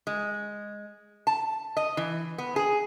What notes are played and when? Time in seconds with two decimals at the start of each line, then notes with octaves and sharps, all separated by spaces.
0.07 G#3
1.27 A5
1.77 D#5
1.97 E3
2.38 B3
2.56 G#4